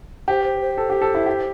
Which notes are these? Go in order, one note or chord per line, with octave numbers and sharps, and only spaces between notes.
G4 C5
C5
C5
A4
G4
A4
E4
G4